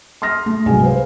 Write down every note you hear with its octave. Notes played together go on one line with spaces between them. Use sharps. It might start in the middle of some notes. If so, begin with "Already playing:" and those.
C6 D#6 F6 A#6
A3
C2 G#2 B2 F#3 G#4 G#5
B4 C5 F5